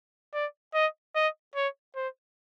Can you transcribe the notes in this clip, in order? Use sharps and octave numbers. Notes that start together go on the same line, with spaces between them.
D5
D#5
D#5
C#5
C5